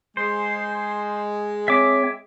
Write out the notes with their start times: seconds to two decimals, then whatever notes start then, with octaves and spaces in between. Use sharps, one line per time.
0.17 G#3 C5
1.68 C4 C#5 E5 D6